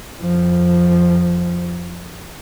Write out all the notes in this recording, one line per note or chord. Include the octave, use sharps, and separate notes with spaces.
F2 F3